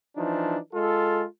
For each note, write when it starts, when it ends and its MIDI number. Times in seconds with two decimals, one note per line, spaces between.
0.17 0.58 52
0.17 0.58 53
0.17 0.58 62
0.17 0.58 63
0.73 1.24 56
0.73 1.24 65
0.73 1.24 69